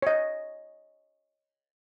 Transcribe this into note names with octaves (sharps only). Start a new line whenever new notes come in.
C#5 D#5